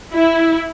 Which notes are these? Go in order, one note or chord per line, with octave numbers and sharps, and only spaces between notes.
E4